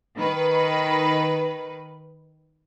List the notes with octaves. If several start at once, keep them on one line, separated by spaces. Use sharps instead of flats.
D#3 B4